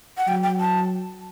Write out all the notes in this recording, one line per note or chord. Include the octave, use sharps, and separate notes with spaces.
F#5
F#3 G5
G5
A5